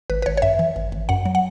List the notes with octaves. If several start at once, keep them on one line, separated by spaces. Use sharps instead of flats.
G#1 B4
B4
G#1 C#5
C#5
F#2 E5
E3
G#1
G#1
F#2 F#5
F#3
F#5